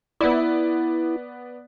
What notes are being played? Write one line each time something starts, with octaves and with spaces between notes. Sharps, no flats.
B3 E4 D5